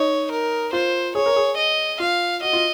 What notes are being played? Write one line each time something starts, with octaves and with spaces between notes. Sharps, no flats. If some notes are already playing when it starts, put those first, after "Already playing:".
Already playing: D#4 C#5
A#4
F4 C5
G#4 C#5
A#4
G#4
D#5
F4 F5
F#4 D#5
F4